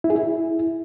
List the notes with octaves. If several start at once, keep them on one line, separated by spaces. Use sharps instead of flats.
E4
G#4
E4